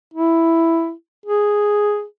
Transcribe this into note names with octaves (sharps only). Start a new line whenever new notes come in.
E4
G#4